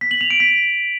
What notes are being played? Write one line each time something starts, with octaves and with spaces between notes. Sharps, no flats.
B6
F#7
F7
D7
B6